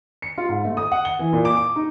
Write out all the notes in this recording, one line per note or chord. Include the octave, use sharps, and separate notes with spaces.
C#7
F4
G#2
A3
D#6
F#5
G7
E3
A#2
D6
D6
D#4